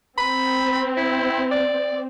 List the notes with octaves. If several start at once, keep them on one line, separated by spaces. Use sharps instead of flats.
C4 B5
E4
D5